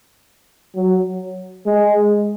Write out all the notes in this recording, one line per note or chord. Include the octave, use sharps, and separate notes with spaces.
F#3
G#3